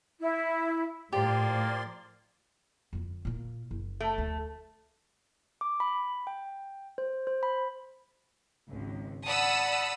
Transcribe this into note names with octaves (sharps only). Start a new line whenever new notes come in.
E4
A2 F3 A#3 G4 D5 C6
F2 D3
A#2 A#3
F#1
A3
D2
D6
B5
G5
C5
C5
B5
G#1 C#2
D5 F#5 A5 B5 D#6 E6